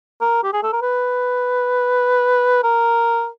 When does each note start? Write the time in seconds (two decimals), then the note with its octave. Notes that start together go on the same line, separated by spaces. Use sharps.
0.21 A#4
0.44 G4
0.53 G#4
0.63 A4
0.73 A#4
0.82 B4
2.64 A#4